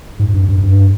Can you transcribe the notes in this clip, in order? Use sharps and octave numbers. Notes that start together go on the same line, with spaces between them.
G#2
G2
G2
G2